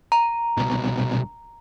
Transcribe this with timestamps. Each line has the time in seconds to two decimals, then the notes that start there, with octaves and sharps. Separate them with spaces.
0.12 A#5
0.58 C2 B2